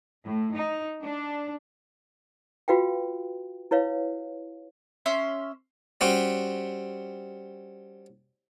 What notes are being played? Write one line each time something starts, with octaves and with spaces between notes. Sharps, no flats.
A2
D#4
D4
F4 F#4 B4 F5 G5
E4 B4 C#5 F5
C#4 E5 C6
G3 C4 C#4 F#4 G4